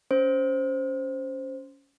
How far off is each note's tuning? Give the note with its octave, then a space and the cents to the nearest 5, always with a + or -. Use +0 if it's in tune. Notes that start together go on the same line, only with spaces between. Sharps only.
C#4 +15 C5 +0